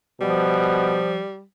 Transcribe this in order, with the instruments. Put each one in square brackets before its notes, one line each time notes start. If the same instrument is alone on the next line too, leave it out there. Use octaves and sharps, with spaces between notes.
[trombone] B2 [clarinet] F3 [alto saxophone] G3